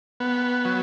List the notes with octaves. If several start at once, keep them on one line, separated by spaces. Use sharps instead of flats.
B3
F#3